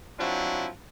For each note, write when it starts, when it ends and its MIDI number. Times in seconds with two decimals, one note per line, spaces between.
0.20 0.68 53
0.20 0.68 54
0.20 0.68 60
0.20 0.68 62
0.20 0.68 64